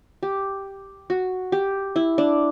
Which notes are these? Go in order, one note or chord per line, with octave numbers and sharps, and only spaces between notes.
G4
F#4
G4
E4
D4